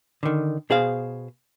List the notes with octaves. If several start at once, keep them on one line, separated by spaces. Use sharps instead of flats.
D3 D#3
B2 G#4 C5 F5